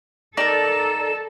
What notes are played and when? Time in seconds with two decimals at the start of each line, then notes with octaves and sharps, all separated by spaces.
0.37 D#4 G4 A4 A#4 D5 E7